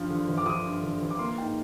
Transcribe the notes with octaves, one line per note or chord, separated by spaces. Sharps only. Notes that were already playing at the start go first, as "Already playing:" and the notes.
Already playing: G2 F3
D3
G1
D6
F3 D#6
G2
D3
G1
D6
A#3 C6
G#2 G5